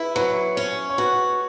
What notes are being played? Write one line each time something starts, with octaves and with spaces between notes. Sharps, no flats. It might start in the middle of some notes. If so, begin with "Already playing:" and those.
Already playing: E4 B4
F#3 B4
C#4 C#5
C#5
F#4 B4